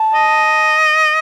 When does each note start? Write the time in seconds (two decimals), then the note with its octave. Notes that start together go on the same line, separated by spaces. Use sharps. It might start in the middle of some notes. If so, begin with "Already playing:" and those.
Already playing: A5
0.15 D#5